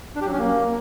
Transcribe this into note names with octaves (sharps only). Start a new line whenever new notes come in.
D4
G4
F#3
C#4
A#3